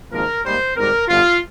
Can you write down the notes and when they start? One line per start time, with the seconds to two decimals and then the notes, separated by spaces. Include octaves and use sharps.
0.11 G#1 G#2 F3 A#3 A#4
0.44 G#2 G3 A#3 C5
0.75 G#1 G#2 G3 C4 A#4
1.08 G1 G2 D3 F4